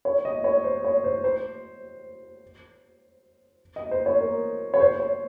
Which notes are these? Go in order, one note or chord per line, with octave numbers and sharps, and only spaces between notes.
C#5
D#5
C#5
C5
C#5
C5
C5
D#5
C5
C#5
A#4
C#5
C5
C#5